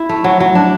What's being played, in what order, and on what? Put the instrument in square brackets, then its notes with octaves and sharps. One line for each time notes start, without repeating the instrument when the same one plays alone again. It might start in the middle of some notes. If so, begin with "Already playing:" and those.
Already playing: [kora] E4
A3
F#3
F#3
D4